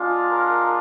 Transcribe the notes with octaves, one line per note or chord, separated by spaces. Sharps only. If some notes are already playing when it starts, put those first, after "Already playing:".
Already playing: G#3 D4 F4
A#4